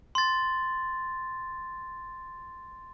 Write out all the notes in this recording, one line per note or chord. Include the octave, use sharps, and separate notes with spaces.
C6 A6